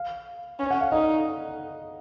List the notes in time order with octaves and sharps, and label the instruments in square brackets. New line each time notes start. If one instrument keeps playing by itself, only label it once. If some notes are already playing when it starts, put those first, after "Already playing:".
Already playing: [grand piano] F5
[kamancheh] C#4
[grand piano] F#5
F5
[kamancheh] D#4 [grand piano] D#5